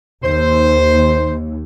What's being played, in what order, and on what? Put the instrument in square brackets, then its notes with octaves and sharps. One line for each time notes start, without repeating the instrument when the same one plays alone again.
[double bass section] D#2 [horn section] C5